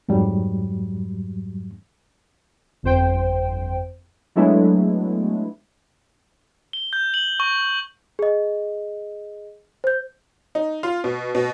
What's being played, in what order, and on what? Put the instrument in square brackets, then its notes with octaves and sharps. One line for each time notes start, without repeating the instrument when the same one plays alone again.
[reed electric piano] F2 G#2 F#3 G3
[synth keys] G1 F2 C5 G5
F#3 G#3 A3 B3 D4 E4
[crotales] G7
G6
F#7
C#6
[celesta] G#4 D#5
C5 G6
[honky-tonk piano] D#4
F4
B2
B2